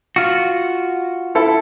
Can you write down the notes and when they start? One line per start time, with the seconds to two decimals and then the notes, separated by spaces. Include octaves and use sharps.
0.16 F4 F#4
1.35 E4 A4